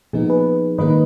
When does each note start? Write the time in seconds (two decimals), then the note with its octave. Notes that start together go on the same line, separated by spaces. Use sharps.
0.13 A#2 F3 B3 D#4 G#4
0.30 G#4 B4
0.78 G#2 D#3 A#3 D#4 B4 D#5